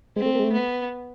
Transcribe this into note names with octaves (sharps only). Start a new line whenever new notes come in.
G#3 C4
A3
A#3
G#3
A3
B3